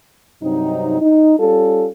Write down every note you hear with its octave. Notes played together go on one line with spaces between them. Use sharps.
G2 C3 F#3 C4 D#4
D#4
G3 C#4 F4 A4